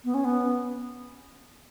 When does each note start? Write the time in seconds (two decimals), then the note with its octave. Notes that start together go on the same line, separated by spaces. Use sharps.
0.04 B3
0.14 C#4
0.24 B3